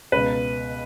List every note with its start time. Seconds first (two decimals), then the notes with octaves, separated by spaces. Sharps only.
0.12 C#2 B2 B4